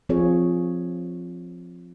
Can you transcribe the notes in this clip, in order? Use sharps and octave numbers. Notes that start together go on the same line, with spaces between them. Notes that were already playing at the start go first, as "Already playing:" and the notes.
F3 C4 F4 G#4 C#5